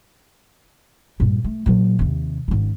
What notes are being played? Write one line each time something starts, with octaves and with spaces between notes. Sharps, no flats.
G2 A#2
A3
A#2 F#3
D#2 C3
G#1 C#3